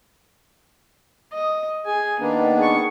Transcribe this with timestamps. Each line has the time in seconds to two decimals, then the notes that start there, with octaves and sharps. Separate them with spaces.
1.33 D#5
1.86 G#4 G#5
2.20 D#3 A#3 B3 D4
2.58 G#4 C#6